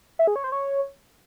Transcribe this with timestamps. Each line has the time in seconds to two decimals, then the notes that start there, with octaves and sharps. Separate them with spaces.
0.19 E5
0.27 G#4
0.36 C#5
0.44 C5
0.52 C#5